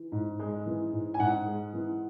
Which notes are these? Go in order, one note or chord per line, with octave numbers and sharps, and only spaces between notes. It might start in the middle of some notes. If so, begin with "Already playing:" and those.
Already playing: E3
G#2
G#3
E3
G#2
G#5
G#2 F#5
G#3
E3